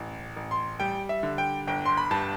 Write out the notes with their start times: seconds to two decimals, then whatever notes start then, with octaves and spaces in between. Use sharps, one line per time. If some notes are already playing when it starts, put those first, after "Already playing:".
Already playing: A1
0.36 A1
0.51 C6
0.80 G3 G5
1.09 E5
1.23 D3
1.38 G5
1.67 G1 G5
1.86 C6
1.97 B5
2.11 G2 A5